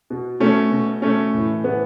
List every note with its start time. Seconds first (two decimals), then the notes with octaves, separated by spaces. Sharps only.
0.10 B2
0.40 B2 A3 C#4
0.71 B2
1.02 B2 A3 C#4
1.34 A2 E3
1.64 A2 E3 B3